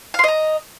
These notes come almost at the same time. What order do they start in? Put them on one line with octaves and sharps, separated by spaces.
F5 C6 D#5 A#5